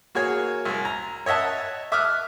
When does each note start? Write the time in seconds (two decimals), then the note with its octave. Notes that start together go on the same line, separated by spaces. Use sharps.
0.15 A#3 F#4 G#4 C#5
0.65 C2
0.85 A#5
1.26 C#5 D#5 E5 F#5 A5
1.92 E5 D6 D#6 F6 F#6